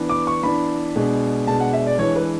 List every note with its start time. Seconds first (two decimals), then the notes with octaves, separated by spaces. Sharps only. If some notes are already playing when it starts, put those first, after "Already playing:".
Already playing: E3 B3 D4
0.09 D6
0.27 C#6
0.43 E3 B3 D4 B5
0.96 B2 G#3 D4
1.47 B2 G#3 D4 A5
1.60 F#5
1.73 E5
1.87 D5
1.99 E3 G#3 D4 C#5
2.16 B4